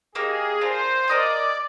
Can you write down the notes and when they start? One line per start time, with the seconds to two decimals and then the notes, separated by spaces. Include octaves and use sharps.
0.15 A#3 D#4 G4 G#4 A#4
0.61 D4 F4 A#4 C5
1.08 F4 A#4 D5 D#5 G#5